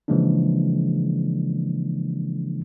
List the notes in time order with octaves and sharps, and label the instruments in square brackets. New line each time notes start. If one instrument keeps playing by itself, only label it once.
[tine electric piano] C#3 E3 F3 G#3 A#3 D4